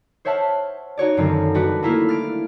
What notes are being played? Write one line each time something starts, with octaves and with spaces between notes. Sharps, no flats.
C5 C#5 E5 F#5 A5 F6
D#4 F#4 C#5 D5
F#2 D3 D#3 C4 F4
G3 D4 D#4 F#4 B4
A3 A#3 E4 F4 A#4
F6 A6 D7